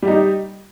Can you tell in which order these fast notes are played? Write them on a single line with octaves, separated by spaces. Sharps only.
G3 G4 D#4